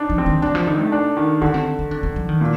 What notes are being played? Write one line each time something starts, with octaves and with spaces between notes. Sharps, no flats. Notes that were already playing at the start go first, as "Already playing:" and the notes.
Already playing: D4 D#4
F3
C4
D#3
D#3 D4
F3
D3 D#4
A3
D4
D#3
D3 D4
C4
D#4
D4
C4
F3
D#3
A#2